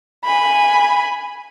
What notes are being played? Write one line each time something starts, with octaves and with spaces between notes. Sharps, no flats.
G#5 B5